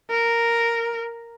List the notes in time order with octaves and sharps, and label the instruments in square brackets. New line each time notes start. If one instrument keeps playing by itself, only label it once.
[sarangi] A#4